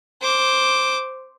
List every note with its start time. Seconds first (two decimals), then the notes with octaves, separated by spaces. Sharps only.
0.21 C5 D6